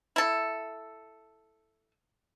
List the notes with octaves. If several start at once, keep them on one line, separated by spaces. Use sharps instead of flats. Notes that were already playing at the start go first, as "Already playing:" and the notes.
E4 A4